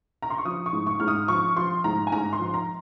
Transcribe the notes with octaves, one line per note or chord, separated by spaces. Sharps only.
A#5
C6
C#6
F3 D#6
C#6
G#2
C#6
G#2 F6
D#6
F3 C#6
F3 C6
G#2 A#5
G#5
G#2 A#5
C6
F3
A#5